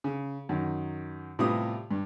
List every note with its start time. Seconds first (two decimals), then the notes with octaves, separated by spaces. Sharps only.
0.04 C#3
0.49 F#2 D#3
1.39 A2 C3 G3 B3 F4 D#6
1.91 G2